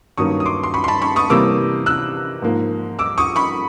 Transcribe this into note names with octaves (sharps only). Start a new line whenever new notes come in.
G2 D#3 F#3 A#3 C#4 C#6 D#6
D#6
C6 D6
C6
B5 C#6
C6
A5 B5
B5 C#6
C#6 D#6
C3 E3 G3 A#3 D6 E6
E6 F#6
G#2 F3 A#3
D6 E6
C#6 D#6
B5 C#6